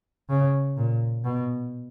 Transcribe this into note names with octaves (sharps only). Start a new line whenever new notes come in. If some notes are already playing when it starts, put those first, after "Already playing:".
C#3
A#2
B2